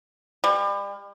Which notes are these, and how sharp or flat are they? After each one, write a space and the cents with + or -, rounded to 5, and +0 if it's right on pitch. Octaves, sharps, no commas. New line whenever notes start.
G3 +35